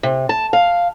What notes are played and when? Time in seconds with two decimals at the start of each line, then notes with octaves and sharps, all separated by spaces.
0.03 C3
0.29 A5
0.53 F5